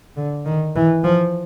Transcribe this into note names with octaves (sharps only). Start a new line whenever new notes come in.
D3
D#3
E3
F3